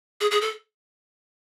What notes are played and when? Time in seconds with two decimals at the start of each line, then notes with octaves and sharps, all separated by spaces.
0.21 G#4
0.31 G#4
0.41 A4